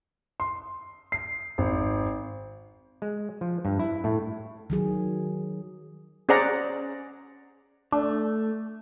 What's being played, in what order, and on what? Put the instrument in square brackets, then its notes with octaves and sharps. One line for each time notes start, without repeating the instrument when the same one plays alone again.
[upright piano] C6
C7
G#1
[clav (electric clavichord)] G#3
F3
G2
E4
A2
[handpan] D#3 F#3 G#4
[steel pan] C#4 G#4 C5 D5 F#5 A#5
[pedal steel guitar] A3 [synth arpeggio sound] D4